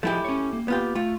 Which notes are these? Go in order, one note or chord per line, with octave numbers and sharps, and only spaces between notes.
F3 A3 E4 G4 G#4 D#5
C#4 C#5
A#3
B3 F4 G4
A3 F4